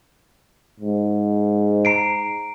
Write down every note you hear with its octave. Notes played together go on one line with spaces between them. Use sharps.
G#2
A#5 C7 D7